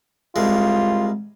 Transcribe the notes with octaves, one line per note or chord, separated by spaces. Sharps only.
C2 G#3 F4